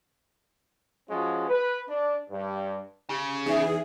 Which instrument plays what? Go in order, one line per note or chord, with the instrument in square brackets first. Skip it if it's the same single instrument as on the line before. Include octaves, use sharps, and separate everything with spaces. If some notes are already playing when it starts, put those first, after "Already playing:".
[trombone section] F3 G#3 C#4 F4 F#4
B4
D4
G2
[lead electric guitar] C#3 [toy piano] G4
[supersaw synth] E2 G#4 [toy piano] D#4 E5